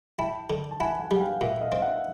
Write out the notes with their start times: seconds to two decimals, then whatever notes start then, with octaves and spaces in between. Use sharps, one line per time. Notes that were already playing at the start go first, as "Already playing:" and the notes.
0.18 E4 G5 A5
0.50 D3
0.71 A5
0.80 E4 F#5 G#5
1.00 F#5 G#5
1.11 G3
1.16 F#5
1.20 F5 G5
1.41 A#2 E5 F#5
1.61 D#5 F5
1.72 C4
1.82 E5 F#5